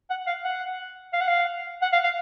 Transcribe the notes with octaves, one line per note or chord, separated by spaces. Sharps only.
F#5
F5
F#5
F5
F#5
F5
F#5
F5
F5